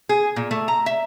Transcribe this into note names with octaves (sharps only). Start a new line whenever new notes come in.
G#4
A#2
A3
A#5
E5